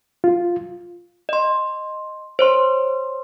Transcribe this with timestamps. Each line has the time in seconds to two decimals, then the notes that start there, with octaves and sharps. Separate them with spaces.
0.24 F4
1.29 D#5 C6
2.39 C5 C#5 C6